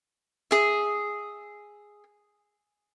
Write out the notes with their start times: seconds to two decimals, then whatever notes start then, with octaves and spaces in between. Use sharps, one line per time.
0.51 G#4 E5